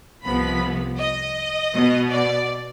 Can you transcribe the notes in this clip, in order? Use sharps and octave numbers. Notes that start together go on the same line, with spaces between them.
C2 C3 F3 B3 B5
D#5
B2 B3
D5